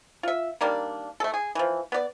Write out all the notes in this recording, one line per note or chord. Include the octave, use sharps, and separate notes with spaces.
F4 E5
D#3 G3 A#3 D4
A3 A4
G#4
E3 F3
B3 D5